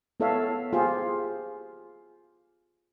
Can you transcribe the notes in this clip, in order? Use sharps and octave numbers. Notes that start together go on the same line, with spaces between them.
B3 E4 A4 C#5 E5 F5
F4 G4 G#4 C5